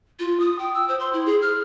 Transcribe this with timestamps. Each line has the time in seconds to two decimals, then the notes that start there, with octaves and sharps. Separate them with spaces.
0.19 F4
0.40 D#6
0.59 G5
0.74 E6
0.88 C5
1.00 C6
1.13 E4
1.26 G#4
1.42 F6